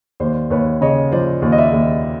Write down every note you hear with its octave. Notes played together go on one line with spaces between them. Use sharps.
D#2 C5 D5
D#2 B4 C#5
C#3 C#5 D#5
F3 C5 D5
D#2
D#5
D5 E5
D#2